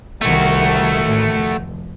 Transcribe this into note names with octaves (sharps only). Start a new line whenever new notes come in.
C2 D#3 A3 F#4
A1 D#3
F1